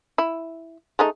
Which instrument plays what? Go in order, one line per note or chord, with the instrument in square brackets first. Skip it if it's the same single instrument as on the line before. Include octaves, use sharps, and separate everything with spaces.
[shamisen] E4
G#3 A3 D#4